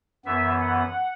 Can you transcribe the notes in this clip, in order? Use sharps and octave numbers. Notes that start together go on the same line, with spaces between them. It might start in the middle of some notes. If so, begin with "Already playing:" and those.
F#2 E3 B3 E5
F#5